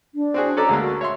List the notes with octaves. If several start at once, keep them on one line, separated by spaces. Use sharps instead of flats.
D4
C4 F#4 G#4
C#4 A4 D5 A#5
D2 G#3 A#3
F#4
C#5 E5 C6